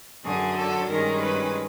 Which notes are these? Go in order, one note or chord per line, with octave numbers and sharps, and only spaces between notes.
F#2 D3 F#3 G#4
A4
G2 D#3 G#3 C#4 A#4
B4